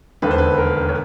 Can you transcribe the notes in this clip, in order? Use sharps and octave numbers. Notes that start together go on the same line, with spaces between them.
E1 D#2 D3 B4
C5
B4
A#4
C#5